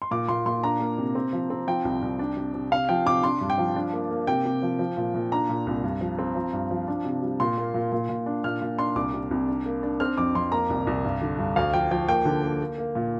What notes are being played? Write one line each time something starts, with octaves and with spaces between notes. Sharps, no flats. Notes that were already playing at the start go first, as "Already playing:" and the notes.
C6
A#2 D6
A#2 C6
A#2 C6
D4 A#5
A#3
C3
C4
F3
C4
F3 G5
C2
C2
D4
C3
C3
C3 F5
F3 G5
C3 D6
D4 C6
G2
G5
F3
D4
A#3
A#3
C3 G5
C3
F3
F3
A#2
A#2
D4 A#5
A#2
C2
G2
F3
C4
F3
G2
F3
D4
C3
G3
A#2 C6
A#3
A#2
A#2
A#2
D4
A#2 F6
A#2
D4 C6
C2 D6
C3
C2
D4
A#3
D4
C4 F6
F2 D6
F2 C6
A#3 A#5
C2
C2
G2
D3
G2
D2 F5
F3 G5
F3 G5
A#3 G5
D3
A#3
A#3
A#3
A#2